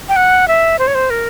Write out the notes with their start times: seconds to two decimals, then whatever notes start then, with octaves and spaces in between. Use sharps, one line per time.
0.09 G5
0.16 F#5
0.48 E5
0.79 C5
0.87 C#5
0.95 C5
1.10 A#4